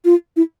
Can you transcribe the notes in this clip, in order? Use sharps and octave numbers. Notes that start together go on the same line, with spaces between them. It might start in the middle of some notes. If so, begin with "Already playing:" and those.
F4
E4